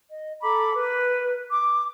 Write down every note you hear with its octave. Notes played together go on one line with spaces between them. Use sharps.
D#5
A4 A#5 B5 D6
A#4 B4
D6